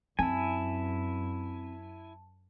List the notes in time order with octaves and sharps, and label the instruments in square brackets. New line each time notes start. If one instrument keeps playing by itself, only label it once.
[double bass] F#2 [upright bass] C4 [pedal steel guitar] E4 G#5 [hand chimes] A5